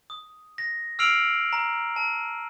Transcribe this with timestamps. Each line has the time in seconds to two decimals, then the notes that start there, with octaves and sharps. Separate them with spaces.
0.10 D#6
0.58 A#6
0.99 E6 F6 C7 D7 F7 F#7
1.53 A#5
1.96 A5